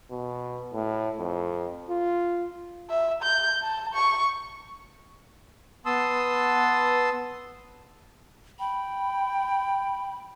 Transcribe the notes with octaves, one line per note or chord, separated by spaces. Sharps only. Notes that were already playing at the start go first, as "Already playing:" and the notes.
B2
A2
F2
F4
E5
G6
A5
C#6
B3 A5 C6 D#6 E6
G5 B5